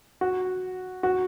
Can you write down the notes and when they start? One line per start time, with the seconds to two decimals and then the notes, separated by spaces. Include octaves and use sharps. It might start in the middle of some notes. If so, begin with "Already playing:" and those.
0.21 F#4
1.03 F#4